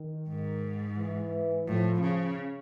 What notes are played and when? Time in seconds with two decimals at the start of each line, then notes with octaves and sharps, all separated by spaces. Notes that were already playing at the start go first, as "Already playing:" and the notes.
Already playing: D#3
0.29 G#2
0.98 E3
1.67 A2 F3
2.02 C#3